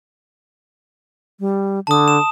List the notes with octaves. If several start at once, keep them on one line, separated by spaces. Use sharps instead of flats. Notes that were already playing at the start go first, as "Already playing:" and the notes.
G3
D3 A5 D#6
E7